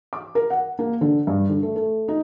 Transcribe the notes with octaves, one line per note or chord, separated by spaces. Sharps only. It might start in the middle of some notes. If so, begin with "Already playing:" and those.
D6
A#4
F#5
A#3
D3
G2
D3
A3
A3
D#4